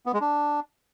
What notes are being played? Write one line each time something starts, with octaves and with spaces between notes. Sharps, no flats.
B3
G#3
D4